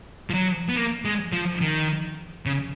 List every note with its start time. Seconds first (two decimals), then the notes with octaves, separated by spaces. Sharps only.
0.30 F3
0.34 F#3
0.69 B3
0.76 A#3
1.05 G#3
1.32 F3
1.61 D#3
2.46 C#3